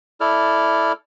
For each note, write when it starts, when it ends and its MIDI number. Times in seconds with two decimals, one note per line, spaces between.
0.21 0.92 64
0.21 0.92 69
0.21 0.92 74
0.21 0.92 89